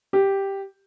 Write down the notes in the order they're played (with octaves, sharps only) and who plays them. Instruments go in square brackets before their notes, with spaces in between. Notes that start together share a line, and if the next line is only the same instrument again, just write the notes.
[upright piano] G4